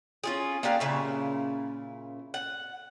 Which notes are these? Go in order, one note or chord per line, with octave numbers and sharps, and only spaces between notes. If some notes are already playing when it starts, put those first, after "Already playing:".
C#4 F4 G#4
A#3 D4 G4 F5
A#2 C#3 E4
F#5